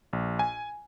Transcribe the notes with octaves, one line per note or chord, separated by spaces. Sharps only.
A#1
G#5